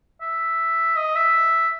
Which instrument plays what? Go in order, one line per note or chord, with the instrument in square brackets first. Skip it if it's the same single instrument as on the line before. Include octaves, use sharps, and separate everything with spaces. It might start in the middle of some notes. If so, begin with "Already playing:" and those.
[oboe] E5
D#5
E5